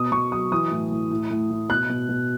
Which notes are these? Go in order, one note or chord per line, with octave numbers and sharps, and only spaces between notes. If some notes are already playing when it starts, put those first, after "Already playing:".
Already playing: B2 D#6
B2 C#6
F#3 D#6
E3 D#6
A2
A2
A2
A2
A2
B2 F#6
B2
B2